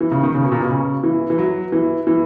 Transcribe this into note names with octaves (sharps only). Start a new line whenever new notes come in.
E3
C#3
D#3
C#3
B2
A#2
B2
C#3
E3
E3
F#3
E3
E3